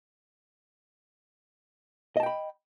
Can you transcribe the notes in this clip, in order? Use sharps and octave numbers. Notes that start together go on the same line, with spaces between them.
D#5 G5 A5 B5